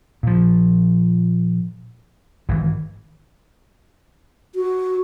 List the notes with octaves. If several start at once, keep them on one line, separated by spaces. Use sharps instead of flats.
A#2 F3
G#1 E3
F#4